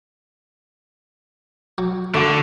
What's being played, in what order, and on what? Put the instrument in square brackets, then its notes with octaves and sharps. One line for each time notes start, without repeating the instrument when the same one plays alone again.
[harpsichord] F#3
[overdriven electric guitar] D3 [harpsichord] A3 F#4